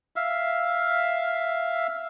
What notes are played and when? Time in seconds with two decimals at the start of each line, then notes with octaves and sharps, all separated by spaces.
0.16 E5 F5